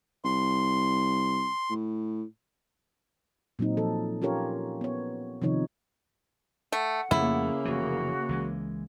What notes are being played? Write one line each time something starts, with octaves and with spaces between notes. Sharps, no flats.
C2 C6
A2
A#2 F#3 C4 D#4
F3 A4
C#4 F4 G4 A#4 C#5
B3 C#5
C3 D#3 F3 D#4 C#5
A3 F#5
F2 C#3 A3 A#3 E4
F1 E3 F#4
C#2 E3 G#3